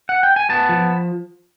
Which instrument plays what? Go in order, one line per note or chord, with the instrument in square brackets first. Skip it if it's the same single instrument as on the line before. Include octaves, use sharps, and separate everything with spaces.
[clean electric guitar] F#5
G5
G#5
B3 A5
F3